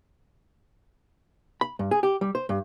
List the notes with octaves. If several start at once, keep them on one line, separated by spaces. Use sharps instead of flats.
B5
G2
G#4
G4
G3
C5
G2